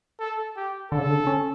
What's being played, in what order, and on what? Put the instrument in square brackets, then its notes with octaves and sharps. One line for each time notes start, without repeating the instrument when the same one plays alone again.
[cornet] A4
G4
[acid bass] D3 [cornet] A4
[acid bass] C#3
D3
C#4